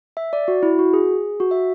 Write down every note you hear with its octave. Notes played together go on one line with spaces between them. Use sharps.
E5
D5
F#4
E4
F#4
G#4
F#4
E5